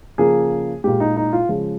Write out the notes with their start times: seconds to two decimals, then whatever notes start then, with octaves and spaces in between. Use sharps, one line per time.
0.18 C#3 F3 A#3 G#4
0.84 A#2 G#3 G4
1.00 D#4
1.17 D#4
1.33 F4
1.49 C#3 F3 G#3